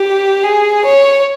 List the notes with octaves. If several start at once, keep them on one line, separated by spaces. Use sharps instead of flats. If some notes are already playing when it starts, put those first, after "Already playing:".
Already playing: G4
G#4
C#5